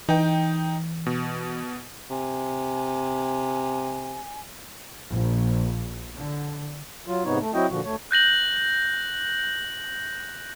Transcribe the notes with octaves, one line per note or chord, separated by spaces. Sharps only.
E3 D#4 G5
B2
C3 G#5
A#1
D3
F#3 F4
G#2 C3 B3 D#4 C#5
A3
F#3 C4 E4 F#4 D#5 G5
A#2 D3 F3 F#4
D2 A3 C#5
F#6 G6 A#6 F#7